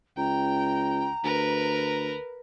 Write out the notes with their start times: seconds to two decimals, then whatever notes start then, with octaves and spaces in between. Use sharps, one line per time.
0.17 C#2 G5 A#5
1.24 D2 A#4 B4